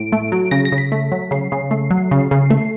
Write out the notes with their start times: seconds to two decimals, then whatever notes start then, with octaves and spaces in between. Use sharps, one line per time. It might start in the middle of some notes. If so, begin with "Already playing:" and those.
Already playing: A2 D7
0.12 A3
0.32 F#3
0.51 C#3 A#6
0.65 A#6
0.72 C#3
0.78 B6
0.92 A3
1.12 F#3
1.31 C#3 C7
1.52 C#3
1.71 A3
1.90 F#3
2.11 C#3
2.31 C#3
2.50 A3